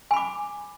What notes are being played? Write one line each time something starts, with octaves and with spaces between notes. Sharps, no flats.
G#5 B5 D6